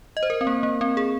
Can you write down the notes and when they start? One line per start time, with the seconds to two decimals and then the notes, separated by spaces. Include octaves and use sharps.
0.17 D#5
0.23 C5
0.30 A#4
0.41 C4
0.47 A#3
0.63 A#3
0.81 C4
0.97 G#4